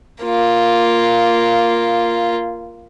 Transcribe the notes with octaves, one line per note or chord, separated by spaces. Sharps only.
A#3 F4